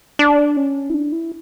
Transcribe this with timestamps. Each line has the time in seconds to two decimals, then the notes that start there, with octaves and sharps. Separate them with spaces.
0.19 D4
0.57 C#4
0.90 E4
0.94 D4
1.12 E4